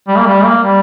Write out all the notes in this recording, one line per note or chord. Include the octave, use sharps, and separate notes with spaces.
G3
A#3
G3
A#3
G3